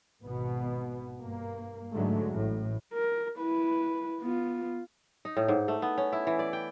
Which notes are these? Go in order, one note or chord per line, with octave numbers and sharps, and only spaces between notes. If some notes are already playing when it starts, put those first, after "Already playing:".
G#1 B2 B3
G2 A#3
G#2 D3 F#3 G#3 A3
A1 A2
A#4
E4 B4
B3 F4
D#4
A2
G#2
A3
B3
C#4
E4
E3
D5
G5